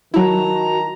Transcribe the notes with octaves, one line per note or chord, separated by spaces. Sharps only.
D#3 F#3 E4 F#4 A5 A#5